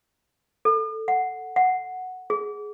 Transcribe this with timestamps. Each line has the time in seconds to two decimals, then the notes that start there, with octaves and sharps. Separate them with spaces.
0.65 A4
1.08 F#5
1.56 F#5
2.30 G#4